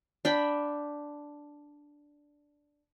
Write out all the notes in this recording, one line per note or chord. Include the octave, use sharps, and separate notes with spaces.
D4 G5 B5